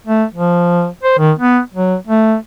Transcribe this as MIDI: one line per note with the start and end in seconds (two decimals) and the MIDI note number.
0.07 0.24 57
0.34 0.87 53
1.03 1.17 72
1.18 1.32 51
1.38 1.60 59
1.74 1.95 54
2.07 2.35 57